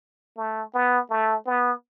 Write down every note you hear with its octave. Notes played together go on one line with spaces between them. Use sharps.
A3
B3
A3
B3